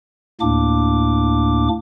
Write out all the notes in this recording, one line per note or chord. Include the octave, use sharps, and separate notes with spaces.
D2 A2 A#3 D4 D6